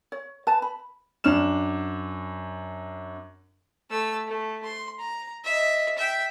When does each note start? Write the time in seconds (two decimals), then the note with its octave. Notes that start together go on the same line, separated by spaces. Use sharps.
0.12 C#5
0.47 B4 A5
0.62 B5
1.24 F#2 D4 F6 E7
3.90 A3 E6
4.27 A3
4.64 C6
5.00 A#5
5.44 D#5 E5
5.98 E5 G5